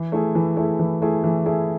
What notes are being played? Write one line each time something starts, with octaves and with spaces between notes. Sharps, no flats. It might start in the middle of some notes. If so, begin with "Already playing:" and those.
Already playing: E3
A3 E4 G#4
E3
A3 E4 G#4
E3
A3 E4 G#4
E3
A3 E4 G#4